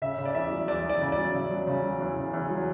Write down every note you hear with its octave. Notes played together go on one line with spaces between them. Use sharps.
C#3 E5
C#3
D5
E2 E5
F#3
E2 D5
E2 D5
C#3
D5
F#3
C#3
F#3
C#3
F#3
E2
C#3
E2
F#3